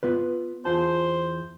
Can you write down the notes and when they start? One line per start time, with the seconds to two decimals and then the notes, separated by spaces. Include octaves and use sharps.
0.03 B3 F4 B4
0.65 E2 F4 C5 A5